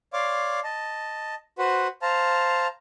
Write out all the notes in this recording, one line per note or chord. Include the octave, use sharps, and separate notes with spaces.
C#5 D5 F5 C6 D6
D#5 A5
F#4 B4 C5 F#5
C5 F5 A5 A#5